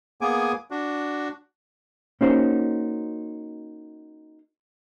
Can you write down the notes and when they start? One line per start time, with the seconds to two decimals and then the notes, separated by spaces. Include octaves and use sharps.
0.21 A#3 B3 G#4 G#5 D6
0.71 D4 F#4
2.21 A#3 C#4 D#4 F#4 C5